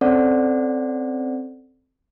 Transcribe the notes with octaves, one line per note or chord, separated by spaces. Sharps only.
C4 C#4 A4 C5 D5 F#5